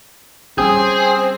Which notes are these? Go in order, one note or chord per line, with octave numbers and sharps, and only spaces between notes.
G3 C4 C#4 G4 G#4 G#5 D#6 G6